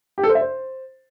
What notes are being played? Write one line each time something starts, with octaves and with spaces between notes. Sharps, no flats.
G4
A4
C5
E5
C5